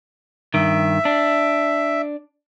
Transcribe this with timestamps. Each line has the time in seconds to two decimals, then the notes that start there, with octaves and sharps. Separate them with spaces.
0.54 G2 D#3 E5
1.05 D4